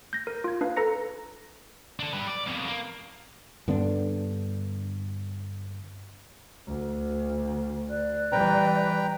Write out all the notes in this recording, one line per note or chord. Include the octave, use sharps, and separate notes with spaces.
G6 A#6
A#4
F4 G#6
D4 B4 F5
A4 B4 A#5 A#6 C#7
D4 A4
G3 B4
D5
F2 B2
A#3
G2 D3 B3 D4
D2
D5 F#6
E3 G3 B4 G5 A#5